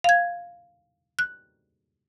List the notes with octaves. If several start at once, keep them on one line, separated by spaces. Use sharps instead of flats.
F5 G#6
F#6